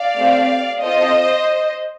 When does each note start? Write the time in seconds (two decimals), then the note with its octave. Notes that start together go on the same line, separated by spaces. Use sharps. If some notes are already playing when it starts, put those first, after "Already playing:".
Already playing: D5 F5
0.16 A3 C4 G4
0.81 C4 F4 A4 C5 D#5